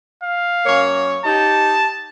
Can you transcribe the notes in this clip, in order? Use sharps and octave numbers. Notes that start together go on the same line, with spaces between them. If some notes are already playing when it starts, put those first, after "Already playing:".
F5
F#2 A#3 C#5
D#4 G4 A5